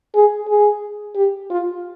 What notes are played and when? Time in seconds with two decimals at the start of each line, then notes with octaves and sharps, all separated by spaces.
0.15 G#4
0.48 G#4
1.15 G4
1.50 F4